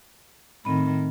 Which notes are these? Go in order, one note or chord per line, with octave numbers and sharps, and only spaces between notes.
A2 D#3 C4 B5